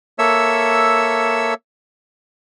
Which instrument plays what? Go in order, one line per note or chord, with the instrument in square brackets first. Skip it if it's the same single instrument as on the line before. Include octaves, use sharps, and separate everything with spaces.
[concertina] A#3 A4 C#5 E5 E6